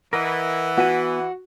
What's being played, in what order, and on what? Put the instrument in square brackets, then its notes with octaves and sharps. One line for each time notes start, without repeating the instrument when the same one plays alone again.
[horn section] E3 [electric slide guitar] A#4 D#5 [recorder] F#5
[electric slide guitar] B3 B4 G#5 [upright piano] F#4